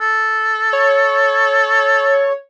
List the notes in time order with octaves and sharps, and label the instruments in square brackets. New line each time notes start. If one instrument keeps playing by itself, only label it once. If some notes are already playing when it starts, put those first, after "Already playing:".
[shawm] A4
[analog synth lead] C#5